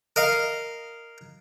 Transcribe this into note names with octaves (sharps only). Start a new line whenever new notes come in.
A#4 D#5 F5